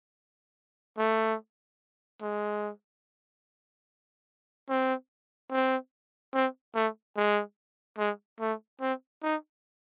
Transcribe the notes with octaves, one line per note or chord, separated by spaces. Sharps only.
A3
G#3
C4
C4
C4
A3
G#3
G#3
A3
C4
D#4